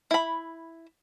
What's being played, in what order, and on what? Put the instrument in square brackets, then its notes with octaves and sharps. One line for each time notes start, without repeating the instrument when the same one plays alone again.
[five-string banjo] E4 B5